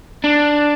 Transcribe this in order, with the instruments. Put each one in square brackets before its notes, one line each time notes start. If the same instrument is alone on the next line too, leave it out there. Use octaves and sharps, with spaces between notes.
[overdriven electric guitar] D4